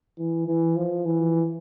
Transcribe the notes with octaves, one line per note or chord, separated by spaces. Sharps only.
E3
E3
F3
E3